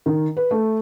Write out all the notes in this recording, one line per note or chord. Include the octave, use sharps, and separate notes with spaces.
D#3
B4
A3